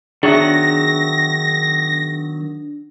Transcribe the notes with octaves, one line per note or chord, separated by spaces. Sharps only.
D#3 F#3 B3 D4 G#4 E5 A#6